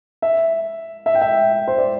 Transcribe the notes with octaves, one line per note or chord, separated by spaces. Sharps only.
E5
E5
G5
E5
C5
D5